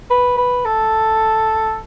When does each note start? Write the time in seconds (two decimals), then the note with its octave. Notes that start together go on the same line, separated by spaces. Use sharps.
0.11 B4
0.37 B4
0.65 A4